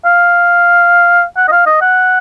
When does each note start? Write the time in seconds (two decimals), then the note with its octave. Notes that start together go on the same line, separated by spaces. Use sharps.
0.05 F5
1.37 F#5
1.48 D#5
1.52 F5
1.67 D#5
1.81 F#5